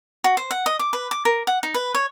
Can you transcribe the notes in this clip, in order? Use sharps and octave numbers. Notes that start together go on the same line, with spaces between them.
F#4
C5
F#5
D#5
D6
B4
D6
A#4
F#5
D#4
B4
C#5